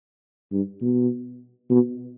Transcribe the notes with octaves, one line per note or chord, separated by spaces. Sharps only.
G2
B2
B2